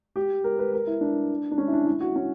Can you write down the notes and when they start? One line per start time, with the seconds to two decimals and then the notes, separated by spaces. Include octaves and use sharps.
0.16 G4
0.44 A#4
0.59 B4
0.74 A#4
0.87 E4
1.01 D4
1.51 D4
1.58 C#4
1.68 E4
1.73 D4
1.86 E4
2.01 F#4
2.16 C#4